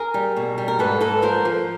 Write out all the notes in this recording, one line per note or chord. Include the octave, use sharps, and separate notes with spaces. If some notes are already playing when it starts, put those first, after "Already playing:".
Already playing: G#4 A#4
G3
B2
G3
A#4
G#2 A4 B4
G#2 A4 B4
F3 A#4 C5
F3